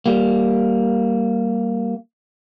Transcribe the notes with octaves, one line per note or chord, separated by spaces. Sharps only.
G3 A#3